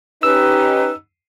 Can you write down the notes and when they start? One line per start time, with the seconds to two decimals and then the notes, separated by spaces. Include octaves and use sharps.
0.23 C#4 D#4 G4 B4 E6